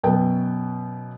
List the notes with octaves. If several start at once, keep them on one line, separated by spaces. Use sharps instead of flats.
F#2 B2 B3 G5